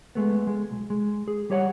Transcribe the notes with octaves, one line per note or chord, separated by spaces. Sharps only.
G#3 A3 B3
G#3
B1
G#3
G#4
G3 G4 C#5 F5 F#5